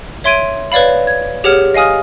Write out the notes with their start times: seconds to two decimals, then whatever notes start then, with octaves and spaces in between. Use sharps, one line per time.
0.24 C#5 E5 C6 G#6 D7 D#7
0.72 B4 C#5 D5 F5 B5
1.07 G#6
1.44 G4 G#4 C#5 F#5 F6 E7
1.74 D#5 F5 G#5 D#6 F6